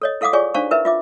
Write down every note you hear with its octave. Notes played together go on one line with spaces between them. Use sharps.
A4 C#5 D#5
E4 A4 F5 F#5 D6 D#6
F4 G#4 C#5 D5 G#5 C#6
D4 D#4 C5 F5 A5 C#6
E4 A#4 B4 E5
F4 E5 D6